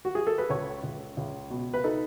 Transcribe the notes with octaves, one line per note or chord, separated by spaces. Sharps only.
F#4
G#4
A4
B4
C#2 C#5
C#2
C#2
B2
B4
D#4 A4